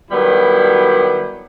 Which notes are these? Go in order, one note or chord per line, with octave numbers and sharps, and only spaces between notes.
D#3 F#3 G3 B3 E4